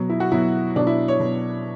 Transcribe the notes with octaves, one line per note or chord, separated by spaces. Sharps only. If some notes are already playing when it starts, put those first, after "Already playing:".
Already playing: B2 F#3
E4
F#4
B2 F#3 E4
B2 F#3 D4
E4
C#5
B2 F#3